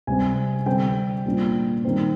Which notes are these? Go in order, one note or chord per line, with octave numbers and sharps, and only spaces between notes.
C3 G3 C4 G#5
D3 G3 C4 G5
A#2 G3 D4
D#3 G3 C4